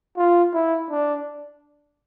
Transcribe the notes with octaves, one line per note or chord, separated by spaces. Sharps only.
F4
E4
D4